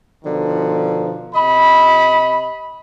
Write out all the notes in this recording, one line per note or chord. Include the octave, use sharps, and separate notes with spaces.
B2 D3 D#3 F3
C3 D#5 B5